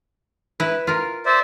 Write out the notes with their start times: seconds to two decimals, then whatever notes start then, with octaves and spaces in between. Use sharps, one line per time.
0.60 E4 B4
0.87 F4 A#4
1.26 C5 D5 E5